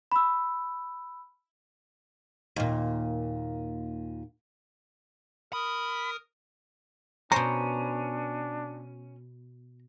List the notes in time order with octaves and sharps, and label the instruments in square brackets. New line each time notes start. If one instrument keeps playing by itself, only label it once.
[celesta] B5 E6
[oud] D#2 A#2
[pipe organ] A#4 D#6 [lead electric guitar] B5
[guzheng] B2 C5 [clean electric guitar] C#4 [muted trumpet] D4 [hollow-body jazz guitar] A#5